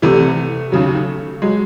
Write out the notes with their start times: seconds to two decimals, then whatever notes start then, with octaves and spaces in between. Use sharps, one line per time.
0.02 C2 C3 E3 A3
0.72 D#2 C#3 F#3
1.42 F#3 G#3